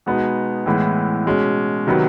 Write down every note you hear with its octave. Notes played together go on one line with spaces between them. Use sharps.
B2 G#3 B3 D#4 G#4
A2 E3 G#3 B3
B2 G#3 C#4
C3 D#3 F#3 B3